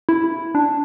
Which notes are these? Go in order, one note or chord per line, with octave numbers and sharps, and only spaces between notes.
E4
D4